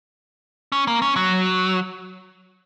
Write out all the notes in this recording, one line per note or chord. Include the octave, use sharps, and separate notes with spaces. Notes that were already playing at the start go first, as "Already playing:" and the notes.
C#4
A#3
C#4
F#3